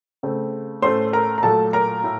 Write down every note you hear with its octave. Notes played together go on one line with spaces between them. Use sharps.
C#3 A3 C4
A2 A3 C#4 C5 C6
A#4 A#5
A#5
A#2 F#3 A3 A4 A5
A#4 A#5
A2